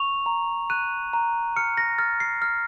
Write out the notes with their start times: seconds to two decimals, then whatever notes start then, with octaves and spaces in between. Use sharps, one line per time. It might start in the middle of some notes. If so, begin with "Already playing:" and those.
Already playing: C#6 F7
0.26 A#5
0.70 F#6 D#7
1.13 A#5
1.56 F6 C#7
1.77 A#6
1.98 F6 A6
2.20 C7
2.42 F6